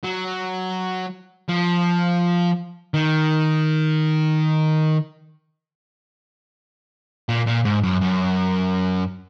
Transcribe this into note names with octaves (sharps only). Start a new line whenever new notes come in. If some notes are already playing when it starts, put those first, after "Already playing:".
F#3
F3
D#3
A#2
A#2
G#2
F#2
F#2